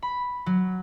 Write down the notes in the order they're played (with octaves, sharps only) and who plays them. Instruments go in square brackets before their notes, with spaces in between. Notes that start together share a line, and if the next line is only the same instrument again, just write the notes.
[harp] B5
F#3